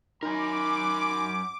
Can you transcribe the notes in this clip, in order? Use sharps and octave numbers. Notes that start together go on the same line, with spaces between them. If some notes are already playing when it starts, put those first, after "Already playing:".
F#2 D#4 A#4 G#5 B5 C6 D6